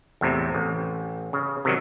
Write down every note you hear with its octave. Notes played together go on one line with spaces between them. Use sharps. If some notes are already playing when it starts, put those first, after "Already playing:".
E2 A2 C3
A1
C#3
C3 D#3 F#3